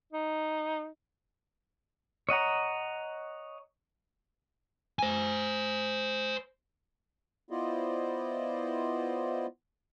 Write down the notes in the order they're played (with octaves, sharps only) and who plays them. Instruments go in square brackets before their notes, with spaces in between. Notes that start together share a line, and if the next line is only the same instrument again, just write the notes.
[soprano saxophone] D#4
[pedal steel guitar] C#5 D#5 F#5 A#5
[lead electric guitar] C5 G#5
[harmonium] B3 E4 F4 C5 D5 D#5